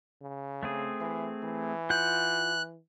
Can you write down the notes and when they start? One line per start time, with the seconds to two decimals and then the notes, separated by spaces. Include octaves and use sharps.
0.21 C#3
0.63 A3 C4 G#4
1.00 E3
1.43 E3
1.90 F4 F#5 F#6 G6